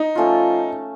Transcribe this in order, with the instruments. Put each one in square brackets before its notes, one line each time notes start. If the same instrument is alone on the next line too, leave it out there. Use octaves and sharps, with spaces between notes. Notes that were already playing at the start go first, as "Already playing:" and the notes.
Already playing: [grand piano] D#4
[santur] F3 A3 C#4 F4